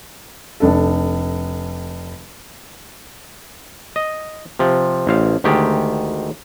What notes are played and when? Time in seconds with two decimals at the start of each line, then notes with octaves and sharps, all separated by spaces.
0.60 F1 D4 A4
3.96 D#5
4.59 C3 F3
5.07 A1 C5 F5
5.44 D2 D#3 G#3 G4